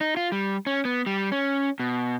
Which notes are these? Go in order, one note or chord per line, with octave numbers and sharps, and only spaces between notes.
D#4
F4
G3
C#4
B3
G3
C#4
B2